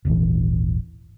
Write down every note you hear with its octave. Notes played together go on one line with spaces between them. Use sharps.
D#1 G#1 A#2 E3